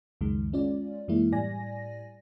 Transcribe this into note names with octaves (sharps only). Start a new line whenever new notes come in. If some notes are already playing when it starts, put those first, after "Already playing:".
C#2 F#2 D#3 G#3
G#3 C#4 F4 D5
F#2 E3 G#3 A#3 E4
A2 G3 D5 G#5 A#6